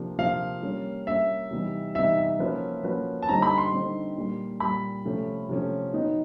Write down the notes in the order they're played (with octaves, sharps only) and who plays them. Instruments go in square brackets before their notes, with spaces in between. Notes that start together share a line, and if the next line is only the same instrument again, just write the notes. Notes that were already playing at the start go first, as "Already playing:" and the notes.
Already playing: [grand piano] C3 F3 A#3 D4
[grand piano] C3 F3 A#3 D4 [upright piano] F5
[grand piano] G3 A#3 C#4
[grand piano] G3 A#3 C#4 [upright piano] E5
[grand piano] C3 E3 G3 B3 D#4
[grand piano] C3 E3 G3 B3 D#4 [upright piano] E5
[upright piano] E5
[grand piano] F3 A#3 C#4 F#4 B4
F3 A#3 C#4 F#4 B4
[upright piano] A5
[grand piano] D3 G3 C4 D#4 [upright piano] A#5
[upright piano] B5
C6
[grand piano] D3 G3 C4 D#4
A#2 G3 A#3
[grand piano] A#2 G3 A#3 [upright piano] B5
[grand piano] C3 F3 A3 C#4
C3 F3 A3 C#4
D#3 F#3 B3 D#4